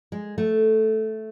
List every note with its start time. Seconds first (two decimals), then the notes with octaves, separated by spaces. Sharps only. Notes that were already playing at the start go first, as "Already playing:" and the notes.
0.12 G#3
0.38 A3